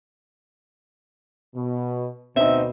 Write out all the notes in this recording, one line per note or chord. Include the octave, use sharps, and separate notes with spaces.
B2
D2 B2 C4 D#4 E5